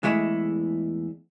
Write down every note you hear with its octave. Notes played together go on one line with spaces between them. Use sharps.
E2 G#3 A3 E4